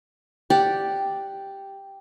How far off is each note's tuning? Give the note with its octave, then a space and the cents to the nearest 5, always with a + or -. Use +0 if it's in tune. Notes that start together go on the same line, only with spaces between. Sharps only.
G4 +0 D5 +0 F#5 +0